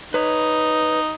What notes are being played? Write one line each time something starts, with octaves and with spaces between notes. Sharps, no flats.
D#4 B4 C#5